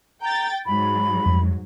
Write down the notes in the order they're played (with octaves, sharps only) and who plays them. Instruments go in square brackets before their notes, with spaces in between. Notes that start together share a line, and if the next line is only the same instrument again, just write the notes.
[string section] G5 G6 A6 [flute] A#5
[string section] G#2 F#3 [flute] B5
[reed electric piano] F2